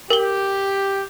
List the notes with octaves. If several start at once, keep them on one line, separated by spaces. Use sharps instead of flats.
G4 A#4 G7